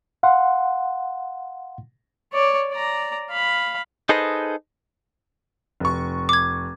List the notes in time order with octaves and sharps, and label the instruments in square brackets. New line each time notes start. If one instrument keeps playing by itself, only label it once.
[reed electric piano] F5 F#5 C6
[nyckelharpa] C#5 D5
D5 A#5
F5 B5
[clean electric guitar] D#4 G#4 A4 B4 C5 D#5
[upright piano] F1 C#6
[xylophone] D6 G#6